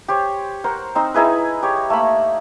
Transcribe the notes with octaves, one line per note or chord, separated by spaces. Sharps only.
G4 C5 C#5
A#4 C5 F#5
C4 D#4 C6
D#4 E4 G#4 B4
G4 C#5
A3 A#3 B5